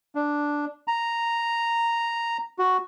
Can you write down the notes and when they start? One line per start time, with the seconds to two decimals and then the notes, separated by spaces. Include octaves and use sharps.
0.15 D4
0.88 A#5
2.58 F#4